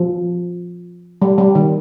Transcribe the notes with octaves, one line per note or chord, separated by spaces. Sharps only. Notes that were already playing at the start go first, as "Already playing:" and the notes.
Already playing: F3
G3
G3
D#3